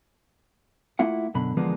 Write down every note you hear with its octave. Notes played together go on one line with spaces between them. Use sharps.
A3 A#3 E4 F4 F#5
F#2 B2 D3 B5
E2 D3 F3 G#3 A#3 B3